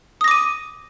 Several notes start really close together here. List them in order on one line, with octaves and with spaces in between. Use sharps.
D#6 A#6 D6 D#7